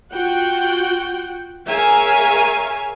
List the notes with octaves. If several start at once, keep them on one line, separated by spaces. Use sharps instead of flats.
F4 F#4 F#5 G5
G#4 A#4 C#5 E5 F5 G#5